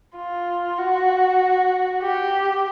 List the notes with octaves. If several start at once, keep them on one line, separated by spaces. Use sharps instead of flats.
F4
F#4
G4